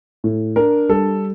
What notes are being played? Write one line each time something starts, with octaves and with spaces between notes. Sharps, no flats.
A2
D4 A#4
G3 A4